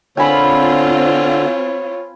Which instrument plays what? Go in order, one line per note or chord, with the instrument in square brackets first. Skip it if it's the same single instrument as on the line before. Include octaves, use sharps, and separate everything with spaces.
[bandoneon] D3 [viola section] C4 F4 [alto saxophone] C#5 [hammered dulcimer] G#5 B5